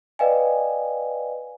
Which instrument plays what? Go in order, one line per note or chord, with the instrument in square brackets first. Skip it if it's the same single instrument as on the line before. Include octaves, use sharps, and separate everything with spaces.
[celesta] B4 D5 D#5 F5 G5 G#5